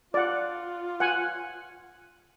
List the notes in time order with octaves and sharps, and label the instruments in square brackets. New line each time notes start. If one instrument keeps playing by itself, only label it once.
[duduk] F4 [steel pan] D5 F#5
[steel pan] F#5 G#5